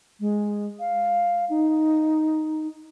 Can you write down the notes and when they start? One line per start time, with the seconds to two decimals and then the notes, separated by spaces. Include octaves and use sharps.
0.20 G#3
0.80 F5
1.50 D#4